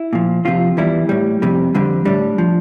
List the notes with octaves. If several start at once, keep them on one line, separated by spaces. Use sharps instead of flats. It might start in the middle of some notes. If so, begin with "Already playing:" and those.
Already playing: E4
A#2 F3
F2 C3 F3 F4
E2 E3 G3 E4
A2 G3
F2 C3 G3
F2 D3 G3
A2 G3 D4
F3